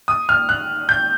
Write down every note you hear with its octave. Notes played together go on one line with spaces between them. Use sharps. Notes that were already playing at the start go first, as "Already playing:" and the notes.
D#6
F6
F#6
G6